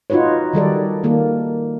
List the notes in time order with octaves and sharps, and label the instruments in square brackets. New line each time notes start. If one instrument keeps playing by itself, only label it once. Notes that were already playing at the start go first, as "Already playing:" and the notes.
[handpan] D#4 F4 F#4 B4 C#5
D#3 G3 A4 D5
D#3 A#3 A4